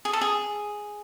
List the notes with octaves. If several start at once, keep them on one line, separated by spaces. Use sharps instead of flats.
G#4
A4
G#4